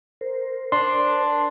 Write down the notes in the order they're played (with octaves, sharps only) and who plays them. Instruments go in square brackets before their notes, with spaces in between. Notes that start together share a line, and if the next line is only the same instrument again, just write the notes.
[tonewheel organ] A#4 C5
[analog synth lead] D4 [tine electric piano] C6